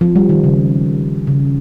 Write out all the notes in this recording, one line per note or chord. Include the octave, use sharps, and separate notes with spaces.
F3
G3
D#3
C#3
C#3